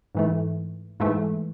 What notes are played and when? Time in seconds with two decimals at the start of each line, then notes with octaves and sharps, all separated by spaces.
0.15 G#2 E3 A3
1.00 G#2 E3 A3